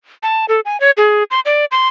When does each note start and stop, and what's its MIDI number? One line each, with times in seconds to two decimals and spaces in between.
0.23 0.45 81
0.49 0.60 69
0.65 0.79 80
0.80 0.91 73
0.97 1.23 68
1.31 1.40 84
1.46 1.65 74
1.71 1.88 84